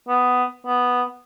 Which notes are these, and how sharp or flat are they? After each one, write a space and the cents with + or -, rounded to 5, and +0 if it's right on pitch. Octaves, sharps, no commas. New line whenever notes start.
B3 +10
B3 +0